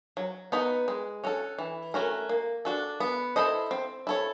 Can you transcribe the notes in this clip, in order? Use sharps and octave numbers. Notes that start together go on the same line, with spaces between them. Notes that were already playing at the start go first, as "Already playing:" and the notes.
F#3
B3 D#4 F#4 B4
G#3
C#4 F#4 A4
E3
A3 C#4 F#4 A#4
A#3
D4 F#4 A4
B3
E4 A4 C5 D#5
C4
E4 A4 C#5